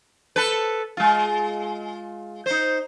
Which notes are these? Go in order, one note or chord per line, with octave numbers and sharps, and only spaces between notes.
A4 B4
G#3 F4
D#4 C5